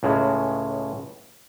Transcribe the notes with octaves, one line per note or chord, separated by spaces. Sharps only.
C#2 A2 C#3 G#3